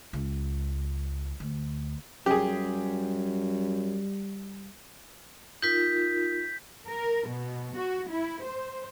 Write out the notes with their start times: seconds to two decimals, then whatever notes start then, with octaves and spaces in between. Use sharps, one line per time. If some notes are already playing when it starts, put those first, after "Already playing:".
0.13 C#2
1.40 D2
2.26 F#2 G3 G4 G#4
5.62 D#4 F4 A#4 G6 B6
6.86 A#4
7.29 B2
7.75 F#4
8.09 E4
8.44 C5